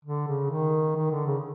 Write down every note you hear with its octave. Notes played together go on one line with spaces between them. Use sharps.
D3
C#3
D#3
D#3
D3
C#3